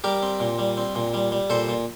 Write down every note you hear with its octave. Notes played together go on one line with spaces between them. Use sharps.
G3 G4 A#4
C4
A#2
G3
C4
A#2
G3
G3
A#2 A4 C5
A#2